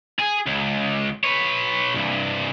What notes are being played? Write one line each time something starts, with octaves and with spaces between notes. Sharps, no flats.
G#4
C#2
B4 C#5
C2 G2